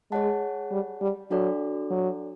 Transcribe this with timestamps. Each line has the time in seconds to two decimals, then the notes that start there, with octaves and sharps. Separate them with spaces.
0.11 G#3 G#4 C#5 F#5 A5
0.71 G3
1.01 G3
1.31 F#3 D4 F#4 A4 D5
1.91 F#3